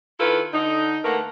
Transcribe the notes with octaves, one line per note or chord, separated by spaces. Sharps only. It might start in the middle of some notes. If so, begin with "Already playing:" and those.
D#3 E4 F4 A4 B4
D3 D#4
D3 A3 A#3 A#4 B4 F#5